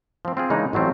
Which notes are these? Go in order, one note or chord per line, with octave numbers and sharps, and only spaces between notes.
F3 C4
C4 F4 G#4
C#3 E3 G#3 A#3 D4 D#4
A1 F#3 A3 C4 F4